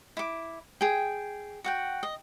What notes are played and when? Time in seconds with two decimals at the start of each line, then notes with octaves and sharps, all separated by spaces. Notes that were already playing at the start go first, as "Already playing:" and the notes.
0.17 E4 D6
0.81 G#4 G5
1.64 F#4 F#5 G5
2.03 D#5